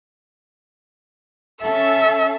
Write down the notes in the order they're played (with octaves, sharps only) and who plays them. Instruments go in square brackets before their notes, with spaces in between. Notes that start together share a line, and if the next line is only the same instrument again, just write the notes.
[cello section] C#4 A4 [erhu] E5